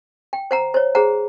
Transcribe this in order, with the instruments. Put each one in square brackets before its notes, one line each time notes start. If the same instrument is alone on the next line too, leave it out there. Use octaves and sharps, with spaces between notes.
[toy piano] G5
C5 F#5 A#5
C5 C#5
[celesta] G#4 C5 [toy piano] F#5 A#5